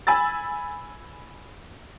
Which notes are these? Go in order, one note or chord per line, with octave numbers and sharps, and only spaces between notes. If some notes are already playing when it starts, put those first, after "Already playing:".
G#5 B5 E6 A6